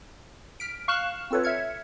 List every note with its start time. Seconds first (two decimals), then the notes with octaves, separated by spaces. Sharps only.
0.60 F6 B6 D7
0.88 F5 C#6 F6 F#6 E7
1.31 C4 F4 A4 B4 C#5
1.43 E5 F6 G#6 C#7